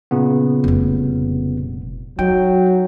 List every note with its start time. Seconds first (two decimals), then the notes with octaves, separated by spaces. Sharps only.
0.11 A#2 C#3 B3
0.64 F1 G3
2.19 F#3 D#4 G5